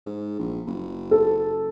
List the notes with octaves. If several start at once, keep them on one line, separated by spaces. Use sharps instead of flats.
G#2
A#1
F#1
A4